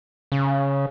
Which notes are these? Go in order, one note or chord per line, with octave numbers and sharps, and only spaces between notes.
C#3